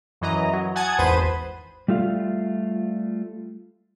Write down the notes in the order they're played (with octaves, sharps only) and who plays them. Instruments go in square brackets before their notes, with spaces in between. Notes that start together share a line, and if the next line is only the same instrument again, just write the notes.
[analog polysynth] F#2 E3 D#5 A#5
F#3
F#5 G#5 A5 D#6 G#6
G#1 E2 B4 C5 B5 D#7
[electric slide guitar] G3 A3 F4 F5